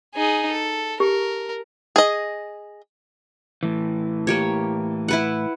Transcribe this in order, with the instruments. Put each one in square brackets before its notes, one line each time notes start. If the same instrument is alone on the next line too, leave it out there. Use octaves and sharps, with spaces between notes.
[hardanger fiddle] D#4 G#4
A4
[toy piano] G4 [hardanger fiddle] A#4
[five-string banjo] G#4 D#5
[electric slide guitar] A2 E3
[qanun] A#3 G4 C#5
E4 B4 F#5